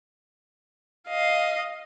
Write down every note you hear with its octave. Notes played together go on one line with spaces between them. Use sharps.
D#5 F5